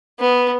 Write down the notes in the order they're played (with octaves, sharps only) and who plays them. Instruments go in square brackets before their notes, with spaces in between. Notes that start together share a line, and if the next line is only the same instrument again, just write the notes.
[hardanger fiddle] B3